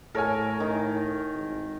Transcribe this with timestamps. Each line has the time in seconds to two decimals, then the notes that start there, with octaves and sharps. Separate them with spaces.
0.15 A2 A4 A#4 C#5 G#5
0.60 D#3
1.34 G#1